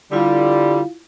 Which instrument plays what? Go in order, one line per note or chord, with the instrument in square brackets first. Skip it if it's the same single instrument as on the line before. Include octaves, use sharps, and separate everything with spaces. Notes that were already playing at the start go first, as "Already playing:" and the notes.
[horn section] D3 G3 [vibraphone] E4 F4 F5